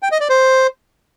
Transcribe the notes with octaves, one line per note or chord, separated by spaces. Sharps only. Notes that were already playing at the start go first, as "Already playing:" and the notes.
G5
D#5
D5
C5